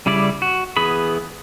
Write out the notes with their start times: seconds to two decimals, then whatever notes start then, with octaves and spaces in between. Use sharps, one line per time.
0.06 C#3 G3 E4 D5
0.42 F#4
0.77 E3 B3 G#4 B5